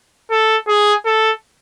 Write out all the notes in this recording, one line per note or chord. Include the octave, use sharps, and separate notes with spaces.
A4
G#4
A4